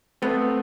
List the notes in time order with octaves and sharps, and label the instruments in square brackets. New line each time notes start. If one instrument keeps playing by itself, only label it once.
[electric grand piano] A3 C4 [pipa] B3